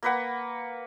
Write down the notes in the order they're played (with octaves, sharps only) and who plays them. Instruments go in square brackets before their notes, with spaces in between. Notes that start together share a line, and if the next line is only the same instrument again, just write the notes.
[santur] A#3 B4 F#5